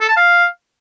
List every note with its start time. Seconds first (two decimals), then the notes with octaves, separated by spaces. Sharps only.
0.01 A4
0.08 A5
0.16 F5